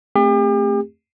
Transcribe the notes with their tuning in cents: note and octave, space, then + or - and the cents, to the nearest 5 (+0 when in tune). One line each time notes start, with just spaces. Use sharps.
A3 +0 C4 +0 G4 +40